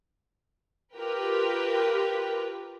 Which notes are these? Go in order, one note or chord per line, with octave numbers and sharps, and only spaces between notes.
F4 G4 A#4 B4 G5